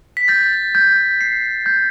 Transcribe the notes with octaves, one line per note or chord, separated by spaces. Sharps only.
B6
G6 A6
G6
C7
G6